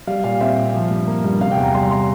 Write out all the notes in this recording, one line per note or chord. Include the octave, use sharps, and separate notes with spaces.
G3 F5
A#2 F5
C4 E5
A#2
F3
G2
A#3
G2
C3 F5
G5
E2
A#5
G3 C6
C6